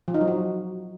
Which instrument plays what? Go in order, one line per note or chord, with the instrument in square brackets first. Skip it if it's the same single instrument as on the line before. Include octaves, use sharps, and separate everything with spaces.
[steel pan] F3
D#4
F#3
F#4